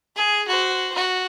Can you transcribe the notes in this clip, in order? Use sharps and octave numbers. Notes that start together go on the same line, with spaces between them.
G#4
F#4 C5
F#4